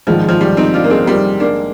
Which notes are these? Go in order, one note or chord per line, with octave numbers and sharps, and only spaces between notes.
A#1 G#2 D#3 F3
F3
G3
C4 D#4
D4 F4
A#3
G#3 C4
G3 A#3
A#3 D4